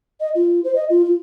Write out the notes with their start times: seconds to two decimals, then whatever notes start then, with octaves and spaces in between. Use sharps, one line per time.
0.20 D#5
0.35 F4
0.64 C5
0.75 D#5
0.90 F4
1.05 F4